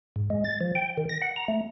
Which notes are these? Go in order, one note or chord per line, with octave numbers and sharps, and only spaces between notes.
G#2
G#3
A6
F3
G5
D#3
A#6
F#5
A#5
A3